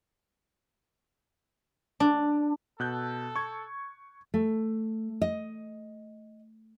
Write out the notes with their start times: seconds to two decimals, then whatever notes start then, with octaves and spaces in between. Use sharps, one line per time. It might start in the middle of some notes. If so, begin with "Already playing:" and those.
2.00 D4
2.80 B2 A4 F#6 G6
3.36 C#6 G#6
4.34 A3
5.22 D#5